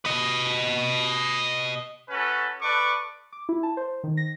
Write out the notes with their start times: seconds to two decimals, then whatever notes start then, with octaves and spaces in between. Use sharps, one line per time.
0.05 B4 D#5
2.10 C#4 F#4 A4 B4
2.61 A4 B4 D5 C#6 D6
3.32 D6
3.49 E4
3.63 A5
3.77 C5
4.04 D#3
4.17 A#6